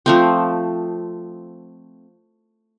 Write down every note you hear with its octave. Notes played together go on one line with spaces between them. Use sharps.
F3 A3 C4